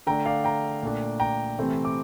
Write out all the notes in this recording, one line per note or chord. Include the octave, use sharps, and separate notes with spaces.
D3 A3 D4 G5 A#5
D5 F5
G5 A#5
A#2 A3 D4
G5 A#5
C3 E3 A3 C4
D6